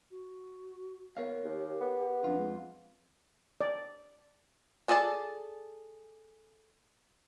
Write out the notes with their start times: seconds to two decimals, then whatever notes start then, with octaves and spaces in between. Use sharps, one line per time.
0.11 F#4
1.17 B3 A#4 C#5 F5
1.44 D#2 G4
1.81 B3
2.24 F2 D4 F4
2.39 G#3
3.61 D5
4.88 D4 G#4 A4 D5 A5